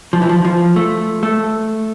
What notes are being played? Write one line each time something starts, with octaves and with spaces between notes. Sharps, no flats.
F3
E3
F3
F3
A3
A3